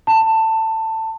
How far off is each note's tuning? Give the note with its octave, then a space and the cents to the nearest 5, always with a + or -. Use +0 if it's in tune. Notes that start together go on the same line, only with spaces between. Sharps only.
A5 +20